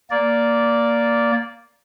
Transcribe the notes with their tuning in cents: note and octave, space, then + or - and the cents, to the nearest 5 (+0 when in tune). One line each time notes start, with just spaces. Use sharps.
A#3 +0 D5 -10